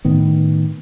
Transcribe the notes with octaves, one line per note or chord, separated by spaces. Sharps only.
A2 D#3 B3